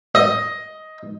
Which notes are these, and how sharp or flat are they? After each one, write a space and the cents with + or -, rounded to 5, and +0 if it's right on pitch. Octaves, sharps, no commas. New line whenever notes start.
D#5 +10